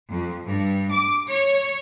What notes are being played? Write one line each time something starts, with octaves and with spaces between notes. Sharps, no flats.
F2
G2
D6
C#5